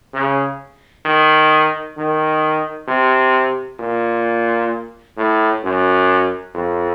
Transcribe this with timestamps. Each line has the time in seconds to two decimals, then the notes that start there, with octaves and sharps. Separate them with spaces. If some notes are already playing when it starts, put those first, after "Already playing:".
0.14 C#3
1.05 D#3
1.97 D#3
2.88 C3
3.80 A#2
5.17 A2
5.63 F#2
6.55 F2